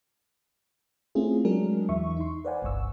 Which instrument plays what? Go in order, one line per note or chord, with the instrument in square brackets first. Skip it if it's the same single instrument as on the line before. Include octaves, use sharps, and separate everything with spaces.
[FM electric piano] A3 C4 C#4 E4 F4 G#4
F#3 G#3 D4 G#4 A#4
E2 E3 E5 C#6
D#4 C6
B4 C5 D5 F5 F#5 G#5
G1 C2 G2 C#6 E6